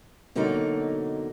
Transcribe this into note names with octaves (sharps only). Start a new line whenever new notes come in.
B2 D3 F#3 A#3 D#4